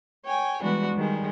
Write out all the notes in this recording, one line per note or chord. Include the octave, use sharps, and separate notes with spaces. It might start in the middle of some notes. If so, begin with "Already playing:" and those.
C#5 G5 G#5
E3 G3 G#3 B3 D4 F#4
D#3 G3 G#3